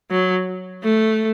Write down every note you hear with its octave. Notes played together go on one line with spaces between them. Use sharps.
F#3
A3